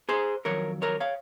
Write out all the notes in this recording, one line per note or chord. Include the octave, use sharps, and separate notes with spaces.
G#4 C5
F2 D#3 F#3 A#4 C#5
A#4 C#5
C#5 F5